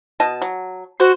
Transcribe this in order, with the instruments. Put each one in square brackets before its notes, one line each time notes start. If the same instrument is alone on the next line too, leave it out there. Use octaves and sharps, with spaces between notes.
[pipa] B2 D#5 A5
F#3
[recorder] F#4 [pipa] C5